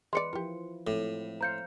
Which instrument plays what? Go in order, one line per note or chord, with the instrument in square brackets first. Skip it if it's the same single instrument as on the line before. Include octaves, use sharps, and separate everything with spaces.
[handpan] E3 B4 [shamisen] G#3 C5 D5 [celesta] C6 C#7
[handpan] F3 E4 F4 [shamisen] G4 A#4
[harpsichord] A2 [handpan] F3 G#3 C4 [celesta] A4
[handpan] C5 F5 [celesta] A#5 G6 C#7